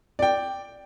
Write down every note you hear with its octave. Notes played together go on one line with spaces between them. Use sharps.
D5 G5